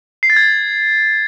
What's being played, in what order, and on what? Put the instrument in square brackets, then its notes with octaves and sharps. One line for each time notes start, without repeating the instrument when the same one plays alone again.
[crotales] C7
A6
G#6